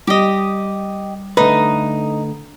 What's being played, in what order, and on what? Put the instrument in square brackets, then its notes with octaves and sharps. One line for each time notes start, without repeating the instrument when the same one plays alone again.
[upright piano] G3 [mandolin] G4 D#5
[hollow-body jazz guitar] D3 A3 B4 [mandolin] D#4